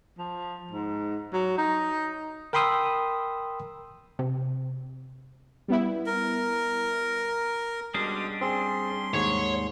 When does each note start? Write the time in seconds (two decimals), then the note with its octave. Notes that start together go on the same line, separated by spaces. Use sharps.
0.18 F3
0.71 G#2
1.33 F#3
1.58 D#4
2.53 A#4 G5 B5 C6 D#6 E6
4.19 C3
5.68 G3 B3 E4
6.06 A#4
7.94 B2 G3 G#3 C#4 D4 D#6
8.41 C4 G#4 C6
9.14 D#2 G#2 C#5